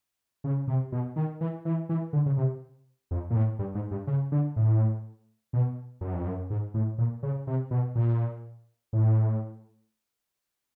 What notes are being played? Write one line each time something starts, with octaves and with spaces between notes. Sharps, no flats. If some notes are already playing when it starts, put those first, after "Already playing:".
C#3
C3
B2
D#3
E3
E3
E3
D3
C#3
C3
F2
A#2
A2
G2
G#2
G2
C#3
D3
A2
B2
F#2
F2
F#2
G#2
A2
A#2
C#3
C3
B2
A#2
A2